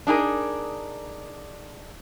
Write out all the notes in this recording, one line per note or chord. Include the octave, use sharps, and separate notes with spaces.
D4 D#4 G#4 A#4